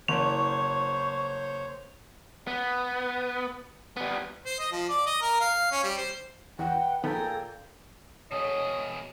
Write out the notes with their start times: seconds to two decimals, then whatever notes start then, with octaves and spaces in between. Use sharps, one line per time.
0.08 F#1 C5 C#5 C#6 F7
2.47 B3
3.97 G3 B3
4.46 C5
4.59 D#5
4.72 F3
4.89 D5
5.06 D#5
5.22 A#4
5.40 F5
5.72 C#4
5.84 G3
5.98 C5
6.59 E2 B4 F#5 G5
7.04 A#2 D#3 F3 B3 G#4 A4 G5 A#5
8.31 B2 G#4 C#5 D#5